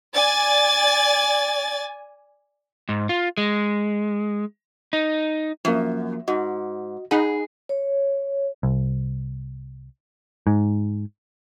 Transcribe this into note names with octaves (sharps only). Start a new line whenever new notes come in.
D5 G#5 A6
G#2
F4
G#3
D#4
F#2 F3 A#3
G#2 F#4 D#5
D#4 G#4 F#5 B5
C#5
C2
G#2